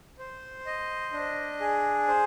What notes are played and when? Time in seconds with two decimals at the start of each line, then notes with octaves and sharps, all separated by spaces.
0.19 C5
0.66 D#5
1.13 D4
1.60 G#4
2.08 C5